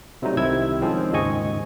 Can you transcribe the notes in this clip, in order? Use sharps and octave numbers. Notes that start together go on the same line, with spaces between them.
C3 F#3 G3 A3 D#4
C2 C3 D#3 E4 E6 G#6
D#3 F3 G#3 C4 C#4
D#2 G#2 C#3 D#5 G#5 C#6